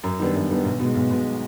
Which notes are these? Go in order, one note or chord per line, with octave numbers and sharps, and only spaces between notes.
F#2
D#3 G3 B3 D4
F#2
D#3 G3 B3 D4
B1
B2 G#3
B1
B2 G#3